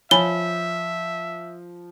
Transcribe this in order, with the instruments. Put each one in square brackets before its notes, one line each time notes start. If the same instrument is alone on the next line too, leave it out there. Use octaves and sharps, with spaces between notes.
[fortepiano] F3 [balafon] C#5 G#5 B5 [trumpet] E5 [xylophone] G7